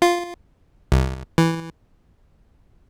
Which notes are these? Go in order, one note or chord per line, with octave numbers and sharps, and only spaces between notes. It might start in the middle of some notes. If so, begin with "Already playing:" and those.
F4
C2
E3